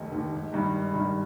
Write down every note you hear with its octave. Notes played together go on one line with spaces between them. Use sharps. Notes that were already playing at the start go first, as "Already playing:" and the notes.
Already playing: F1 D#2 D#3
D#2 D#3
G#1
G2 D#3 G3
G#1
G2 D#3 G3